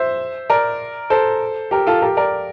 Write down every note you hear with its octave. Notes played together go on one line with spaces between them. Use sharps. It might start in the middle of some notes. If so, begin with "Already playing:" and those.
Already playing: C5 E5
A#4 D5
A4 C5
G4 A#4
F4 A4
G4 A#4
A#4 D5